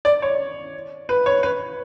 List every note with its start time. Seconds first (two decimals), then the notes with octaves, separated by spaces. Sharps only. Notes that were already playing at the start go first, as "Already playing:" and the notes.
0.05 D5
0.22 C#5
1.09 B4
1.26 C#5
1.43 B4